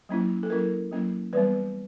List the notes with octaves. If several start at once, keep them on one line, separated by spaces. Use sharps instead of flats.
F#3 A#3 C#4 E4
A4
F#3 A#3 C#4 E4 A#4
F#3 A#3 C#4 E4
E3 G3 B3 B4